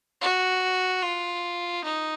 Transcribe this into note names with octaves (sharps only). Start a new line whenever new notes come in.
F#4
F4
D#4